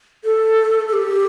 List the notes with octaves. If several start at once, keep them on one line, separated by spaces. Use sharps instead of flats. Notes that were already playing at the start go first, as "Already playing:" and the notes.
A4
A4
G4